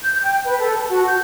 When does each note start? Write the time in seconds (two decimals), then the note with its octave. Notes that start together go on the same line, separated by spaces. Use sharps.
0.03 G6
0.22 G5
0.44 B4
0.60 A4
0.76 A5
0.90 F#4
1.08 G6